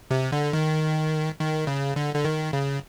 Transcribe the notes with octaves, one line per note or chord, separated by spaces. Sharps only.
C3
D3
D#3
D#3
C#3
D3
D3
D#3
C#3